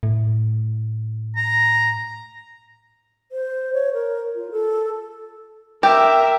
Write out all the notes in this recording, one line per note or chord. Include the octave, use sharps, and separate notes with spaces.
A2
A#5
C5
C#5
A#4
F4
A4
G4 A#4 E5